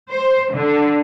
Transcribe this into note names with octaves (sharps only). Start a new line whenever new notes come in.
C5
D3